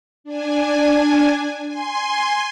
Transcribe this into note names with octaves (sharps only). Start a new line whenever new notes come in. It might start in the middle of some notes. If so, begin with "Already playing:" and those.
D4 G#5
G#5 C6